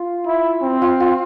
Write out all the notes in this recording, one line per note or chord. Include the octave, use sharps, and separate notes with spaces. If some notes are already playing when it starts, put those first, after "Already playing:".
Already playing: F4
E4
C4
F4
F4